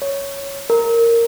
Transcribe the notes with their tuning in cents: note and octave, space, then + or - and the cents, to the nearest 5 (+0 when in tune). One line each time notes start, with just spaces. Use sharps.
C#5 +5
A#4 -10